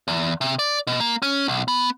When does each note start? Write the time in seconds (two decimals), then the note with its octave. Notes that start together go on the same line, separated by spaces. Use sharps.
0.08 E2
0.41 C3
0.59 D5
0.87 B2
1.00 A#3
1.22 C#4
1.48 B1
1.68 B3